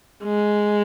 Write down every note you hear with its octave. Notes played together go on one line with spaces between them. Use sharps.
G#3